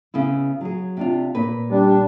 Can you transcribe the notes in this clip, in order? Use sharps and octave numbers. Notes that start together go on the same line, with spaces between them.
C#3 B3 E4
F#3 G#4
C3 D4 F4
A#2 B4
G3 D4